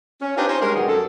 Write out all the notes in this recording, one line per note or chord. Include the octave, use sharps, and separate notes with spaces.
C#4
D4 D#4 F4 G4 B4 C5
C#4 D#4 G4 C5
G3 G#3 C#4 A#4
G#2 B2 D#3 F#3 B3 G#4
F#2 A4